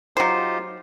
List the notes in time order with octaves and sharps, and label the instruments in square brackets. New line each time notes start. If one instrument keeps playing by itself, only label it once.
[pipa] F#3 C5 [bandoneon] D#4 F4 G4